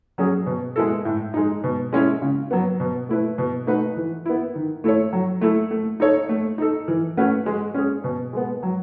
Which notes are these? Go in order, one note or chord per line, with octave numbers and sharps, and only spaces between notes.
F#3 C#4 G#4
B2
G#3 B3 E4 A4
A2
G#3 D#4
B2
G#3 C#4 E4
C#3
F#3 B3
B2
A3 E4 B4
B2
A3 D#4 F#4 B4
E3
B3 E4
D#3
A3 E4 A4 C#5
F#3
A3 E4 A4
A3
D#4 A4 C#5
A3
D#4 A4
E3
A3 C#4 F#4 B4
G#3
C#4 G#4
B2
G#3 B3
F#3